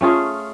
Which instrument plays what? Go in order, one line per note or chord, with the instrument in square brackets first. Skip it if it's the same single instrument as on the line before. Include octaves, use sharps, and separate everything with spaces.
[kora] A3 C#4 F4 G#4